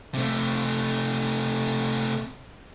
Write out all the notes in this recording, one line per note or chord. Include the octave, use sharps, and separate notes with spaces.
C3 A3